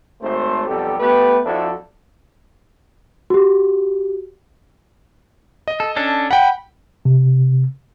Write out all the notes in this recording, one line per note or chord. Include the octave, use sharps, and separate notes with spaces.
G#1 A3 C5
B1 F2 G3 G4 A4
A3 B3 G4 B4
F2 F3 D4 E4 F#4 A4
F#4 G4
D#5
A4
C#4 D4 A4
F#5 G5 B5
C3